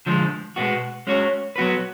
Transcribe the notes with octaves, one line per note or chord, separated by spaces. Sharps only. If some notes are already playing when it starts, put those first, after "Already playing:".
D3 F3 G#3
B2 G#3 B3 F#4
G#3 C#4 F#4 C#5
F#3 B3 F#4 B4